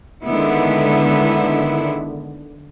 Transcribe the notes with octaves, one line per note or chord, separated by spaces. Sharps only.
D3 D#3 G#3 B3 E4